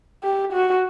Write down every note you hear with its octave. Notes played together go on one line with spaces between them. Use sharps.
G4
F#4